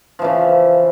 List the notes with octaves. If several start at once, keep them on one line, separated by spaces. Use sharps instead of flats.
C#3 E3 F3